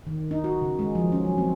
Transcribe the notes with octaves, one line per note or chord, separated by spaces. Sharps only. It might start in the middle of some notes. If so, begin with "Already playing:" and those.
D#3
D#4
F#4
C#3
G#3
F3
C#4
F#3
C4